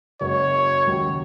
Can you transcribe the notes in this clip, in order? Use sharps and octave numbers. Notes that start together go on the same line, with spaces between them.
F#1 F#2 C#3 G#3 C#5
D#2 C#3 F#3